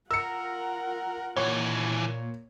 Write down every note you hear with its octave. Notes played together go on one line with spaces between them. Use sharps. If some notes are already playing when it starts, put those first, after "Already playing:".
F4 A#4 F#5 E6 C#7
D#2 A#2 E3 C#5